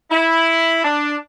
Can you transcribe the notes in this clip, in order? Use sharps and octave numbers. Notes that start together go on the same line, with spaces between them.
E4
D4